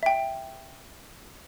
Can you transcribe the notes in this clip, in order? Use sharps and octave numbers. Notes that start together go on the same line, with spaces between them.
E5 G5